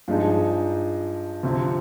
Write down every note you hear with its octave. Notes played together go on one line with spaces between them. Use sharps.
G2 F3 G#3 D#4 G#4
D2 C3 F3